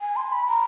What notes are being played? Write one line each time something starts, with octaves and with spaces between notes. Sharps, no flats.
G#5
C6
B5
A#5